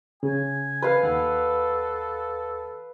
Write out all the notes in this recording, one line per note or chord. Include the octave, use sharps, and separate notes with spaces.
C#3 G#5
B4 F5
D#2 A4 F#5